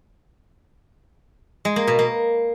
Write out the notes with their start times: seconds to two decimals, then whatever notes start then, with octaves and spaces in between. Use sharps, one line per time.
1.65 G#3
1.76 A#3
1.87 B2
1.99 A#3